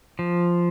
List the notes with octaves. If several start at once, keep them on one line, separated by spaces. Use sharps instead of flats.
F3